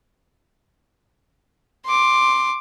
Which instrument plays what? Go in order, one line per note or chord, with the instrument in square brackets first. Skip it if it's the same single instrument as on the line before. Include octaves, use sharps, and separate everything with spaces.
[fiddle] C6 D6